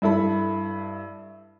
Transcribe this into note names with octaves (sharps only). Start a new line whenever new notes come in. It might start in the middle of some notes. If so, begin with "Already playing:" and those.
G2 E4 A4 B5